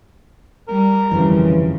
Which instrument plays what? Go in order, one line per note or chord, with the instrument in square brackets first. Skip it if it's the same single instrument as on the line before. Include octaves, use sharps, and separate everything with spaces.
[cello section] G3 [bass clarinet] A#4
[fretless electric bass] G1 F2 G3 [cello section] C#3 F3 [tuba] E3